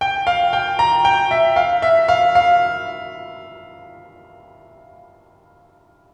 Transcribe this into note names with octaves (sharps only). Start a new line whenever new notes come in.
G5
F5
G5
A#5
G5
E5
F5
E5
F5
F5